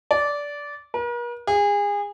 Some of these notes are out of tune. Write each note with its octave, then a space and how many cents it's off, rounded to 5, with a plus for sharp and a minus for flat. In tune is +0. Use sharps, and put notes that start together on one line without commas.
D5 -15
A#4 +45
G#4 -30